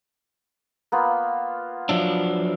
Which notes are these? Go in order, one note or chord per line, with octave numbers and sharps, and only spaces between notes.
A#3 B3 F4
F3 F#3 D4 E5